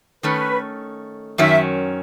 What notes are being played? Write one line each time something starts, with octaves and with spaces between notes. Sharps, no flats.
D#3 A3 C#4 B4
F#2 D#3 F#3 C#4 E5